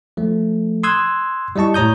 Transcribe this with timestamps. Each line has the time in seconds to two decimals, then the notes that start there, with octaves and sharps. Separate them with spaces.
0.17 F3 A3
0.83 C6 D#6 E6 F#6 G#6
1.56 G3 E4 D#5 A5 C#6
1.74 A2 C#5 A#5 D#6 G6